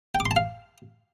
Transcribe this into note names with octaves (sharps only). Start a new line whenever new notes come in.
G5
D6
C6
A5
F5